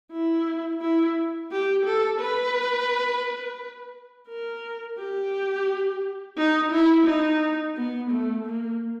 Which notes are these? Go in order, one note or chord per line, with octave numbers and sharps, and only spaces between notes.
E4
E4
G4
A4
B4
A#4
G4
D#4
E4
D#4
B3
A3
A#3